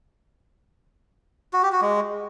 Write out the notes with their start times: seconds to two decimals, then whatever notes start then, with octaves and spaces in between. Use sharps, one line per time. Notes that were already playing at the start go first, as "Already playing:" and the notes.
1.53 F#4
1.63 G4
1.72 F#4
1.82 G#3